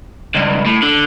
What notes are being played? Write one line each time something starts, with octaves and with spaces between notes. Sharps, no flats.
C#2 G2
A2
D3